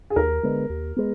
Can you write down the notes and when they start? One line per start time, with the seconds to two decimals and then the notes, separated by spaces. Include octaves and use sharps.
0.10 G#4
0.16 D#2 A#4
0.43 D3 G#3 B3
0.70 D#2
0.97 G#3 B3